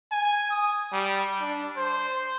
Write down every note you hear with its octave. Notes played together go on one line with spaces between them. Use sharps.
G#5
D#6
G3
D4
C5